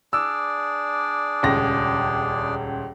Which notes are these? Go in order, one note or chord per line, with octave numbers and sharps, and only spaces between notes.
D4 G#4 D5 E6
D#1 C#2 A#6